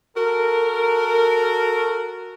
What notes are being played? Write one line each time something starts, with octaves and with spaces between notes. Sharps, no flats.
F#4 A4 A#4